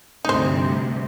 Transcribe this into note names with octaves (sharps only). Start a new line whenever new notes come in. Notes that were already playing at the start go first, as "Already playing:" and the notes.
D2 G2 C3 D#4 C5